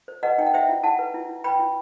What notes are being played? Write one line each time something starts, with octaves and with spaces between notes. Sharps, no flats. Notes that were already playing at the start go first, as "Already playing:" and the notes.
C5
B4 D#5 F#5
D#4 G5
F#5
C5 E5 G5
E4
E4 F#5 A5
B4
E4
E4
B4 G5 B5
E4